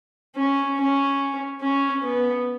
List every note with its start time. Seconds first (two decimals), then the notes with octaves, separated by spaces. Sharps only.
0.36 C#4
0.77 C#4
1.61 C#4
2.03 B3